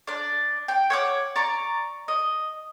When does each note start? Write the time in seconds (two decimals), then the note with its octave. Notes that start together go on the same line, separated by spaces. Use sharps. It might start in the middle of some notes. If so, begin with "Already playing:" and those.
0.07 D4 D5
0.68 G5
0.90 C#5 F#5 D6
1.36 D5 A#5 C#6
2.08 D#5